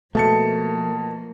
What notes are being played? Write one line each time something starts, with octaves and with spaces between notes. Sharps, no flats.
B2 F3 A3 A#3 A5 C#7